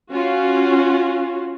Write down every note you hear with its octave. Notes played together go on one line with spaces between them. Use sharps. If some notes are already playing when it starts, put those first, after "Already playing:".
C#4 F4 F#4